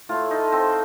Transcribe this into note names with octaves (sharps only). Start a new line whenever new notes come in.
A2 A3 F4
D#4
C4